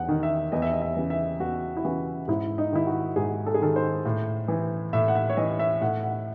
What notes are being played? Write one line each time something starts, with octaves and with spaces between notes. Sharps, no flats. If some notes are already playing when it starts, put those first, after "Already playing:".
Already playing: E2 F#5
D#3
E5
E2 D#5
E5
D#5
E5
C#3 E3
E5
E2 F#4
E4
C#3 E3 F#4
G#2 E4
D#4
D#3 E4
F#4
G#2 G#4
A4
G#4
D#3 A4
C5
A2
E3
A2 E5
F#5
E5
C#5
E3 D#5
E5
A2 F#5
F#5